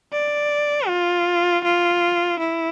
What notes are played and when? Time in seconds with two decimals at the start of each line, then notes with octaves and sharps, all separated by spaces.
0.13 D5
0.88 F4
1.64 F4
2.39 E4